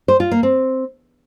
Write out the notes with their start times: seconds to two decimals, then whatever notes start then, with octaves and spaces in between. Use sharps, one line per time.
0.08 C5
0.20 F4
0.31 A#3
0.43 C4